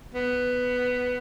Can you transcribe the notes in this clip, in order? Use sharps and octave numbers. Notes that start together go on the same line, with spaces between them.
B3